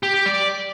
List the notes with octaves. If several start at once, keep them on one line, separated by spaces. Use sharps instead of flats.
G4
G4
D5